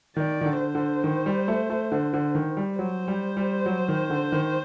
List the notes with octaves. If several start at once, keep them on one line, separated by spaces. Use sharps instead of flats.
D#3 D5
D#3
D3
C5
D3
D#3
G3
A3
A3
D3
D3
D#3
G3
F#3 C5
G3
G3
F#3
D#3
D3
D#3